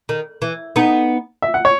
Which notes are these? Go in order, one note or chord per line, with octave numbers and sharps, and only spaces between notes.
D#3
E3
B3 D#4
E5
F#5
C#5